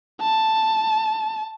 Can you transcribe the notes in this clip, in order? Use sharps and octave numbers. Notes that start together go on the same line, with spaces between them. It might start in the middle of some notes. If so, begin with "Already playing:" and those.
A5